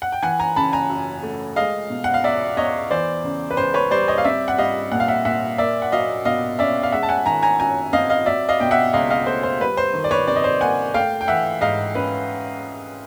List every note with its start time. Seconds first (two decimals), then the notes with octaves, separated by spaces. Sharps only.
0.02 F#5
0.12 G5
0.23 E3 F#5 G#5
0.39 G#5 A#5
0.56 C#3 A5 B5
0.73 G#5 A#5
0.90 F#2
1.23 A3
1.56 G#3 D#5 F5
1.90 B2
2.04 F#5
2.14 F5
2.23 E2 D5 E5
2.57 E2 C#5 D#5
2.91 E3 C5 D5
3.24 C#3
3.51 B4
3.57 C#2 C5
3.74 B4 C#5
3.91 G3 C5 D5
4.08 C#5 D#5
4.18 F5
4.24 C4 D5 E5
4.48 F#5
4.58 G3 D#5 F5
4.92 A#2 F#5
5.00 F5
5.08 E5 F#5
5.25 A#2 E5 F#5
5.58 A#3 D5 E5
5.82 F#5
5.92 F#3 D#5 F5
6.25 B2 D#5 F5
6.59 C#4 D5 E5
6.83 F5
6.92 G#3 E5 F#5
7.03 A5
7.09 F#5 G#5
7.26 D#3 G#5 A#5
7.42 G#5 A#5
7.59 F#2 G#5 A#5
7.93 C4 D#5 F5
8.10 D#5 F5
8.26 F#3 D5 E5
8.49 D#5 F5
8.60 B2 G5
8.71 E5 F#5
8.93 C#2 D#5 F5
9.10 D#5 F5
9.27 A3 C5
9.43 C5
9.60 G3 B4
9.77 C5
9.93 D#3
10.04 D5
10.11 B4 C#5
10.27 C3 D5
10.36 D#5
10.44 C5 D5
10.61 A#3 F#5 G#5
10.94 A3 F5 G5
11.21 G5
11.28 E3 E5 F#5
11.61 G#2 D#5 F5
11.95 C#4 B4